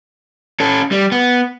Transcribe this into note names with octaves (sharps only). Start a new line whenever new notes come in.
C#4 A4
G3
B3